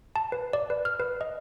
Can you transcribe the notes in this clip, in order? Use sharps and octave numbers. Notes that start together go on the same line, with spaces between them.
A5
B4
D5
B4
F6
B4
D#5